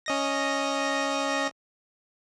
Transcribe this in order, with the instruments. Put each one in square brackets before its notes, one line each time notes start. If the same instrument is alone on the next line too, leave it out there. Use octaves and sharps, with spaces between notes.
[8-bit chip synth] C#4 D#5 A#6